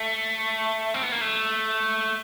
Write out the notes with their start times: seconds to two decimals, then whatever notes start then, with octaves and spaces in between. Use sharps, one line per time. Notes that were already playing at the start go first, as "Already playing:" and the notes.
Already playing: A3
0.94 C4
1.03 B3
1.12 A#3
1.21 A3